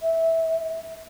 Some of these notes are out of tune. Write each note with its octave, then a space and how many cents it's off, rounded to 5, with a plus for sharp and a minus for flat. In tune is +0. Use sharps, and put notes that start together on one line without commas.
E5 -15